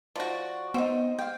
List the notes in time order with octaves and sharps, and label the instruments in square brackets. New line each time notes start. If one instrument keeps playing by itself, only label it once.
[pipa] F3 F#4 [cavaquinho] D5
[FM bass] B3 [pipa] C4 [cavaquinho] D#4 F#4
[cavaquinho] F5 G5